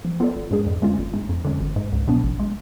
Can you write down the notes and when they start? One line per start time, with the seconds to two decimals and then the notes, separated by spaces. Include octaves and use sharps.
0.05 F3
0.20 B3 F4 A4 D5
0.35 G#1
0.51 G#2 G#3 D4 G#4
0.67 F2
0.82 D3 G#3 C#4 F4
0.98 G#1
1.14 G#2 G#3
1.29 F2
1.45 D3 G#3 C#4
1.60 G#1
1.76 G#2 G#3
1.92 C#2
2.08 B2 F#3 B3 D4
2.24 A1
2.40 G#3